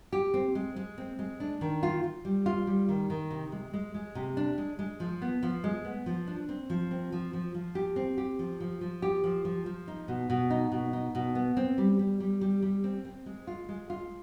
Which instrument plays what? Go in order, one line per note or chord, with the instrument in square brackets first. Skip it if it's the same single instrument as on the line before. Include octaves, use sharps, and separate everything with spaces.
[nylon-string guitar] G4
C4
G#3
G#3
C4
G#3
D4
D#3
F4
F4
G3
F4
G3
D#3
D#3
C3
G#3
G#3
G#3
C3
D4
G#3
G#3
F3
B3
F3
G#3
B3
F3
D4
C4
F3
C4
F3
F3
F3
G4
C4
G4
F3
F3
F3
G4
F3
F3
F3
D#4
B2
B2
D#4
B2
D#4
B2
B3
C4
G3
G3
G3
G3
G3
C4
C4
G#3
F4
G#3
F4